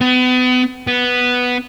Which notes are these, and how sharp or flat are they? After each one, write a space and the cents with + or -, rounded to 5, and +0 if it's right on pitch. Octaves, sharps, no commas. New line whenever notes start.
B3 +35
B3 +0